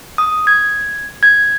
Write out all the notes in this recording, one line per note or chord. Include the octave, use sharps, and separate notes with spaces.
D#6
G#6
G#6